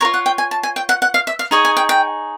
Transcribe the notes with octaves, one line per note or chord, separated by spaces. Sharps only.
F4 A#4 C#5 A#5
F#5
G5
G#5
A5
G#5
G5
F#5
F#5
F5
E5
F5
D#4 G#4 C#5 G#5
G#5
G5
G5